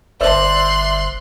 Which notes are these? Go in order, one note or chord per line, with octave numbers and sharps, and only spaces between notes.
G1 C5 D5 E5 C6 F#6